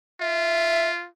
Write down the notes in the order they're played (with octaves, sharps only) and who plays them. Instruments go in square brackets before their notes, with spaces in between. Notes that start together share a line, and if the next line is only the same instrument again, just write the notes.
[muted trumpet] F4 [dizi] E5